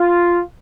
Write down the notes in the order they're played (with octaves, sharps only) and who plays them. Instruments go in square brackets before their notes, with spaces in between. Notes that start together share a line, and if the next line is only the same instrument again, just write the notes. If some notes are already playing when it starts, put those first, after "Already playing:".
Already playing: [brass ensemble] F4